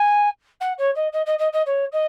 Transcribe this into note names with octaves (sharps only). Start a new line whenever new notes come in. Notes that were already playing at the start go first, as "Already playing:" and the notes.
Already playing: G#5
F#5
C#5
D#5
D#5
D#5
D#5
D#5
C#5
D#5